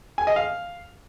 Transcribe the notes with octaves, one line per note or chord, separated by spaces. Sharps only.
G#5
D#5
F5